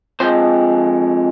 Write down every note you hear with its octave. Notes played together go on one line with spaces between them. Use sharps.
F2 F3 G#3 C5